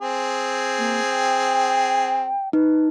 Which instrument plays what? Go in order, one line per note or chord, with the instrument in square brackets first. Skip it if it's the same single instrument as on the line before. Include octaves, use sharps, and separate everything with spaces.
[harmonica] C4 G#4
[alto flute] A#3
G5
[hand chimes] D#4 [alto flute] B4